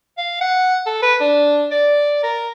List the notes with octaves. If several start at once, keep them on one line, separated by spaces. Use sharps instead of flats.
F5
F#5
A4
B4
D4
D5
A#4